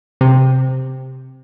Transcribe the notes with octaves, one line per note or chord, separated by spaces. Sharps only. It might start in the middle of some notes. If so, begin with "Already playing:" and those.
C3